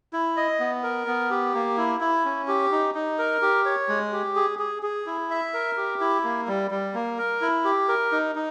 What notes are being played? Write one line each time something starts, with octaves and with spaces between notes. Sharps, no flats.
E4
D#5
B3
A#4
B3
G4
A#3
E4
E4
C#4
G4
D#4
D#4
A#4
G4
C#5
G#3
G4
G#4
G#4
G#4
E4
E5
A#4
G4
E4
A#3
G3
G3
A#3
A#4
E4
G4
A#4
D#4
D#4